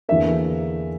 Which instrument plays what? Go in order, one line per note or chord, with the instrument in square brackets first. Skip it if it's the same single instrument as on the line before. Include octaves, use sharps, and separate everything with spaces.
[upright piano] E2 D3 A#3 E5